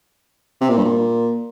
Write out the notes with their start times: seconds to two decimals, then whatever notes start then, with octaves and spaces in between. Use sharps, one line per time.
0.61 C3
0.69 A#2
0.78 G2
0.85 A#2